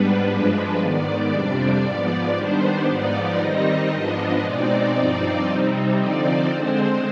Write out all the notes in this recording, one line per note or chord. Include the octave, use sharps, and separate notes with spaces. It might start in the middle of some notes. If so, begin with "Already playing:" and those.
Already playing: G#2 G3 B3 D4 B4
G2 F3 G#3 D4
G#2 D#3 B3 D5
F2 C3 G3 D4 D5
G#2 F3 B3 D5
D#3 G3 B3 D4 C5
G#2 F3 B3 D#4 D5
D#3 G3 C4 D#4 D#5
G#2 F3 B3 D4 D#5
B2 G#3 C4 D#4 D5
G2 F3 C4 D#4
C3 G3 C4 D#4
D3 F3 C4 D#4 D5
D3 G#3 C4 C5